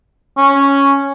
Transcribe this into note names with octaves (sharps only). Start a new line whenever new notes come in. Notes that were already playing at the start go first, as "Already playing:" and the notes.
C#4